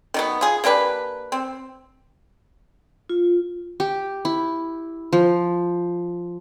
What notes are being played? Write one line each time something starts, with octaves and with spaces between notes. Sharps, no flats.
D#3 F#3 B3
F4 G#4
A#3 D4 G4 B4
C4
F4
G4
E4
F3